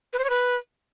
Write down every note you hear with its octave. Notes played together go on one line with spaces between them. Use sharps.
B4
C5
C#5
B4